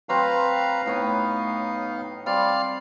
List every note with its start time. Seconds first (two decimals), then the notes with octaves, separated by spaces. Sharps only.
0.09 F#3 C4 B4 F5 A#5
0.86 A2 B3 D#4 B4 C#5 F5
2.26 G3 C4 D5 F5 F6